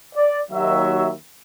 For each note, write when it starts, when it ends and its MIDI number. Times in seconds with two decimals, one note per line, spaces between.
0.16 0.39 74
0.51 1.11 39
0.51 1.11 54
0.51 1.11 76